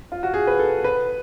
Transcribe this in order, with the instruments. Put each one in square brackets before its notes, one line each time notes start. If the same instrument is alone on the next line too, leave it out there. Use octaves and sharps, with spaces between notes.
[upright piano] F4
F#4
G#4
B4
A4
B4